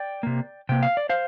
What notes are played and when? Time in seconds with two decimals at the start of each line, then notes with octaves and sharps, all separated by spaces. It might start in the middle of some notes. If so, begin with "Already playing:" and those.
Already playing: D5 G5
0.23 C3 A#3
0.69 C3 A#3 G5
0.83 F5
0.97 D5
1.09 C5 F5